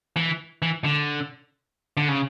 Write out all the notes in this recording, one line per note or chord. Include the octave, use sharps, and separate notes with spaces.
E3
E3
D3
D3
C#3